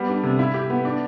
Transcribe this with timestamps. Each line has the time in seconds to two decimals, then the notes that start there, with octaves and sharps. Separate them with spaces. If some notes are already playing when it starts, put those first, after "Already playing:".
Already playing: G3 B3
0.08 D4
0.23 C3
0.39 E4
0.54 G4
0.70 B3
0.85 D4